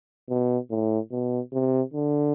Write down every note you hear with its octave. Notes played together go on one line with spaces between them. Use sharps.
B2
A2
B2
C3
D3